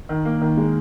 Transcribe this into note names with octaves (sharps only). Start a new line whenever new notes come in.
D#3
A#3
D#3
G#3